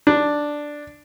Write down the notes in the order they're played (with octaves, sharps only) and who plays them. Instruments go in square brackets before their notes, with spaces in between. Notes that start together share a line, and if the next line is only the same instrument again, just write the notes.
[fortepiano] D4